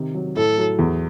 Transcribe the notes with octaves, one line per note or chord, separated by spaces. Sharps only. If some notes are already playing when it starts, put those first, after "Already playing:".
Already playing: C3 D#3
F#3
A2 A4
F#3
E2